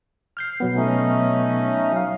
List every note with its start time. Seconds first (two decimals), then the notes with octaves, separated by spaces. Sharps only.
0.37 F6 G6 C7
0.60 B2 F#3 B3
0.76 A3 C#4 D#4
1.92 F#3 F5